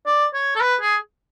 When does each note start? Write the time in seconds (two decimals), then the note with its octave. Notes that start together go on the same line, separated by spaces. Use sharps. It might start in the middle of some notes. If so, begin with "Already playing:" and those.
0.07 D5
0.34 C#5
0.56 A4
0.61 B4
0.81 G#4